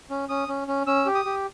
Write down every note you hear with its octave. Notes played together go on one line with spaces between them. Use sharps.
C#4
C#4 D#6
C#4
C#4
C#4 E6
G4
D#6
G4